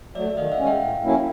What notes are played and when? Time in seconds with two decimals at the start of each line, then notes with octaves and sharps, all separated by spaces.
0.15 F#3 A3 D5 E5
0.37 D#3 D#5 F5
0.52 E5 F#5
0.59 G#3 C#4
0.67 F5 G5
0.81 A2
1.03 F#3 A#3 C#4 E4